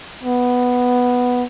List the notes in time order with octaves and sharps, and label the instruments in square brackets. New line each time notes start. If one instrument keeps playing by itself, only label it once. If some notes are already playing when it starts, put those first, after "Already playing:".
[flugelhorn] B3